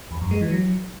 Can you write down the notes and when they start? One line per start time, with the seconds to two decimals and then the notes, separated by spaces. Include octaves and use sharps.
0.11 E2
0.21 F#2
0.31 G#3
0.41 E3
0.51 F#3